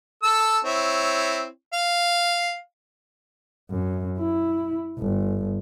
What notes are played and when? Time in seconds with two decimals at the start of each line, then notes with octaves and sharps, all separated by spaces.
0.23 A4 E6
0.64 C4 E4 C#5
1.73 F5
3.71 F#2
4.19 E4
4.99 G1